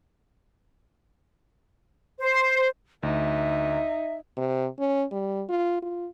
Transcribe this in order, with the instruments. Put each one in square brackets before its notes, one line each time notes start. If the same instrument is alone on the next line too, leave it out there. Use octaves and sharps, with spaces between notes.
[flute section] C5
[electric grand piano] D2 [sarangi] D#4 [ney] E5
[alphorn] C3
C#4
G3
F4
F4